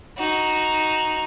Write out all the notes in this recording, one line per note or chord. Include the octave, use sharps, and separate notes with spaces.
D#4 F#4